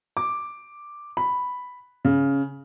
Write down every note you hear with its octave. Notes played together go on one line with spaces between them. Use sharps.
D6
B5
C#3